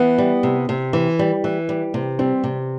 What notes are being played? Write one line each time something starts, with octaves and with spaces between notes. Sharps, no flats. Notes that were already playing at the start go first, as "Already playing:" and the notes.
Already playing: E3 B3
G3
C3
C3
E3
G3
E3
G3
C3
G3 C4
C3